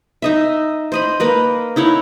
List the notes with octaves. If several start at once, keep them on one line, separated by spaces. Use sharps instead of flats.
D#4 D#5 E5
C5 D#5 B5
A#3 B4 D#5
D#4 E4 C#5 F#5